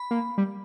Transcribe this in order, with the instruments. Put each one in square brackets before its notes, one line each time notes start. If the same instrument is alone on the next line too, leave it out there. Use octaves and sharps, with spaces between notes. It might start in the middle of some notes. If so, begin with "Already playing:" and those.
Already playing: [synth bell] B5
[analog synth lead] A#3
G3